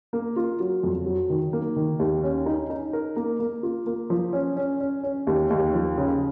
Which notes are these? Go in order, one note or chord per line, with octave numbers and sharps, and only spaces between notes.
A#3
F4
F#3
F2
F#3
D#3
A#3
D#3
D#2
C#4
D#4
D#4
A#4
A#3
A#3
F4
A#3
F3
C#4
C#4
C#4
C#4
D#2
D#2
F3
C#3